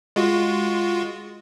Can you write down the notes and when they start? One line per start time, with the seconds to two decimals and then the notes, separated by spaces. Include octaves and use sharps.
0.16 G#3 F4 F#4